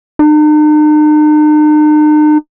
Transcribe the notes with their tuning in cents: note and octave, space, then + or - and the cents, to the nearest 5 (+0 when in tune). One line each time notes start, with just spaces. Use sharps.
D#4 -45